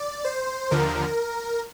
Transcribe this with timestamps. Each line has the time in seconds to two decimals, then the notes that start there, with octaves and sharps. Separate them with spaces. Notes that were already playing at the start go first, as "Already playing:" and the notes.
Already playing: D5
0.25 C5
0.71 D#2 D3 F3 A#4